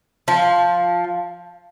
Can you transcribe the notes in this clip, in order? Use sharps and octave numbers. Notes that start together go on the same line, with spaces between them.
F3